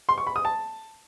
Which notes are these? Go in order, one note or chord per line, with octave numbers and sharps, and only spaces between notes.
C6
C#6
B5
D#6
A5